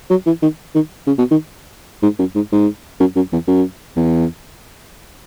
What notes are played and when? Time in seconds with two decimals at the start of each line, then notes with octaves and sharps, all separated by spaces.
0.10 F#3
0.26 E3
0.42 D#3
0.75 D#3
1.07 C#3
1.18 B2
1.31 D#3
2.03 G#2
2.19 F#2
2.35 G#2
2.52 G#2
3.00 F#2
3.16 F#2
3.32 E2
3.48 F#2
3.96 E2